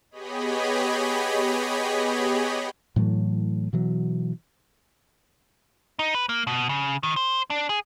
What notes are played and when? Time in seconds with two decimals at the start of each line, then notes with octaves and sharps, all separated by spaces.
0.11 B3 G4 G#4 C#5 D#5 B5
2.96 A2 E3 F#3 A3
3.73 B2 E3 F#3
5.99 D#4
6.15 B4
6.29 A#3
6.47 B2
6.69 C#3
7.03 D#3
7.16 C5
7.50 D4
7.69 G#4